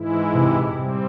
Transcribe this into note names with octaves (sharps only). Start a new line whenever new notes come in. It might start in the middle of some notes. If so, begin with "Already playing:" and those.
Already playing: G#2 E3 G#3 E4
C3
G3 C4